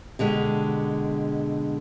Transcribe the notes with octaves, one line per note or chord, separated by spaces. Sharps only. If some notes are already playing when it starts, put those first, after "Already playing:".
B2 D3 G#3 G4